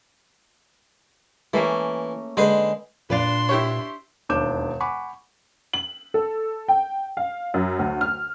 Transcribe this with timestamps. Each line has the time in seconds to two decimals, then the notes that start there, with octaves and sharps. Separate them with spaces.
1.54 E3 A3 A#3 C#4
2.37 D3 G#3 B4 C5
3.10 A#2 D4 B4 D5 F5 C6
3.49 E4 G4 C#5
4.29 E1 D#2 D4 D6 G6 E7
4.80 F#5 G#5 B5 C#6 D6
5.73 F#7
6.14 A4
6.68 G5
7.17 F5
7.54 F#2
7.79 D2
8.01 F6